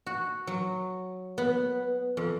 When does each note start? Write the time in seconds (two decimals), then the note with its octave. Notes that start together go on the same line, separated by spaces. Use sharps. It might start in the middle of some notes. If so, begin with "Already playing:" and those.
0.06 F#4
0.47 F#3
1.38 B3
2.17 F2